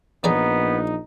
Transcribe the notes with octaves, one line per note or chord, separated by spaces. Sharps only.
A#1 B3 D#4 G#4 C#5 D5